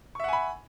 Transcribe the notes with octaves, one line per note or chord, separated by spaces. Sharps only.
E5 F#5 G#5 B5 C#6